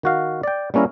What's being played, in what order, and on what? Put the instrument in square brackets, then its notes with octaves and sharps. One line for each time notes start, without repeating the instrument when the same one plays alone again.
[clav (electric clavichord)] D#3 F#4 F5
D5 G5
G3 A#3 C#4 E4 A#4